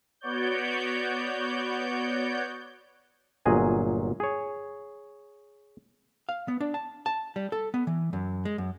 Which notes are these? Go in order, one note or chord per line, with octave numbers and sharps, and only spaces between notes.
B3 F#4 C#5 D5 G6
G1 A#2 F#3 G#4 D#5 G#5
G#4 C#5
F5
B3
D4
A5
A5
G3
A4
B3
E3
F#2
G#3
F#2